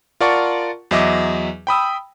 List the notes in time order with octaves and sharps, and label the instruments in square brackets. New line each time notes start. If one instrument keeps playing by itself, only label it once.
[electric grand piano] F4 A#4 D5 F#5 A5 C#6
E2 F#3 D#5 E5 D6
G5 B5 D#6 E6